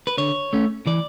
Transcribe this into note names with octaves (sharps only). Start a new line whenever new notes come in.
B4
D3 C#5
A3 C#4
E3 D5